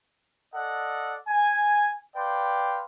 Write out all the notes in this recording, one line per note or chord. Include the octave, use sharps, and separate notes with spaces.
A4 D5 D#5 F#5
G#5
B4 C5 D5 F5 G5